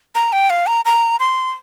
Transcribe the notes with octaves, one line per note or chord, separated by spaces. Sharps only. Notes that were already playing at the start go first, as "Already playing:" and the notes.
A#5
G5
F5
A#5
A#5
C6